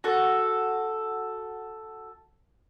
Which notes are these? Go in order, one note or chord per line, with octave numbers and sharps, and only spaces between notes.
F#4 A4